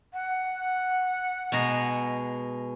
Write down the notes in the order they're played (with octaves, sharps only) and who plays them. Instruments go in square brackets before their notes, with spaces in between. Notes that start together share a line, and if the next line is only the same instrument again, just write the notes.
[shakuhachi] F#5
[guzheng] B2 G#3 A#5